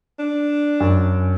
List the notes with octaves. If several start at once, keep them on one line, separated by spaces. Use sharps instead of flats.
D4
F#2